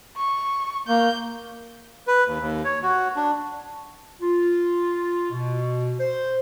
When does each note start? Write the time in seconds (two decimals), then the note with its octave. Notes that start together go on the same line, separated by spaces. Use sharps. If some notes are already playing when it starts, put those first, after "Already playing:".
0.16 C#6
0.88 A#3 G6
2.07 B4
2.26 D#2
2.40 D#2
2.65 C#5
2.83 F#4
3.16 D4
4.20 F4
5.31 B2
6.00 C5